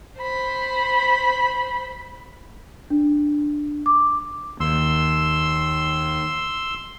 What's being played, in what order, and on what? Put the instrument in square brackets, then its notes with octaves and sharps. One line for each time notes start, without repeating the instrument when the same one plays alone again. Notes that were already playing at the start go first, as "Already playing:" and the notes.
[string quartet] C5 B5
[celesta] D4
D6
[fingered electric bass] D#2 [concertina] C6 E6